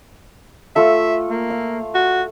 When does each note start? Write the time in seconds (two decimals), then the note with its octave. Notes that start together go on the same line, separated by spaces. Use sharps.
0.76 A3 F4 A4 E5
1.30 A#3
1.50 F5
1.95 F#4